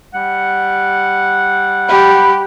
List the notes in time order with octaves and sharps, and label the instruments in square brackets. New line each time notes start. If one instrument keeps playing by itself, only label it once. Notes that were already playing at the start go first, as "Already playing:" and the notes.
[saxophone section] G3 F#5
[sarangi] G4 [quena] B5